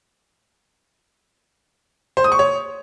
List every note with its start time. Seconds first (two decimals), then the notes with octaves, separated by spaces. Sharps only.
2.17 C5
2.24 D#6
2.32 C#6
2.39 C#5